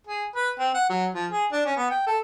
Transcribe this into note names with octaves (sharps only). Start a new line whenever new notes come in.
G#4
B4
C4
F#5
F#3
F3
G#4
D4
C#4
B3
G5
A4